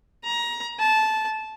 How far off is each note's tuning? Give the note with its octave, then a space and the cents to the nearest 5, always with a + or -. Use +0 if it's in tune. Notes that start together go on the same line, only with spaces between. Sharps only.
A#5 +25
A5 -15